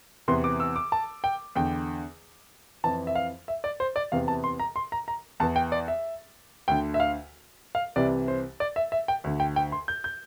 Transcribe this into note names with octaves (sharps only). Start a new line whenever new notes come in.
E2 C3 E3 C6
D6
E6
D6
A5
G5
E2 D3 G5
F2 E3 A5
E5
F5
E5
D5
C5
D5
E2 C3 E3 F5
A5
C6
A#5
C6
A#5
A#5
E2 E3 A5
G5
D5
E5
D2 D3 G5
E5
F5
F5
C2 C3 E3 D5
C5
D5
E5
E5
G5
D2 D3
G5
G5
C6
G6
G6